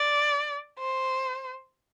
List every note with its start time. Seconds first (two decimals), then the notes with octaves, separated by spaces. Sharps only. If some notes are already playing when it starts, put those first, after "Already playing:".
Already playing: D5
0.79 C5